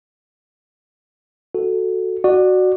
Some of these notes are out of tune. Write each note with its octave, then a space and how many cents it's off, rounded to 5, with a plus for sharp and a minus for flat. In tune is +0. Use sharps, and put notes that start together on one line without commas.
F#4 +0 A4 +0
F#4 +0 D5 +25